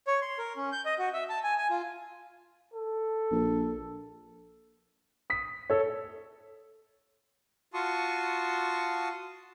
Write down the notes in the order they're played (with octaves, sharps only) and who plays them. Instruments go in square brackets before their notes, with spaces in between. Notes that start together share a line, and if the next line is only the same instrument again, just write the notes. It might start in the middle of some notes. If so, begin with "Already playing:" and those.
[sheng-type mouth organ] C#5
C6
A#4
C#4
G6
D#5
F#4
E5
A5
G#5
G#5
F4
[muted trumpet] A4
[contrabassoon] A#1
[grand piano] D#6 B6
A4 C#5
[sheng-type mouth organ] F4 F#4 A5 C6 C#6 D#6